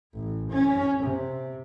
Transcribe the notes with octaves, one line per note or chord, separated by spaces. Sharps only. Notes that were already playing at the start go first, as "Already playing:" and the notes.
A1
C#4
C3